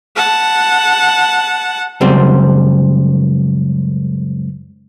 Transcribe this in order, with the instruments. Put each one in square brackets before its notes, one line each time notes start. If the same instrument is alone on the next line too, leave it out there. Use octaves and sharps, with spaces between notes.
[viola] F#5 A5
[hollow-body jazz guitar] C#2 F#2 G3 C4